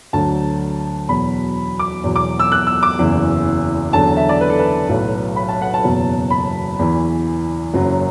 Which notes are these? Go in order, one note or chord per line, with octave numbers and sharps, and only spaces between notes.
D2 D3 F#3 A5
E2 B2 F#3 B5
D6
E2 B2 F#3
D6
E6
F#6
E6
D6
F#1 E2 E3
E2 D3 F#3 A5
E5
D5
B4
A4
B4
B1 A2 F#3
B5
A5
F#5
A5
F#1 E2 B2 F#3
B5
E2 E3
F#1 F#2 F#3